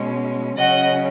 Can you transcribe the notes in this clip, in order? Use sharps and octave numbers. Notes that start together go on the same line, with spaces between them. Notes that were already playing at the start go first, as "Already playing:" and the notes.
Already playing: B2 G#3 C#4
C#3 F#3 C#4 D#5 F#5